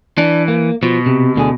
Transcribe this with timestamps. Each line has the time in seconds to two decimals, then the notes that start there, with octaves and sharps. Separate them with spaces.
0.18 E3 D4
0.48 A#3
0.83 B2 F3
1.06 C3
1.36 D2 D3 G#4